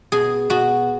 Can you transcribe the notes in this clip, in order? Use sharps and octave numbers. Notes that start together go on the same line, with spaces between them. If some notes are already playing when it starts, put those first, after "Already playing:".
B2 G#4
B2 F#4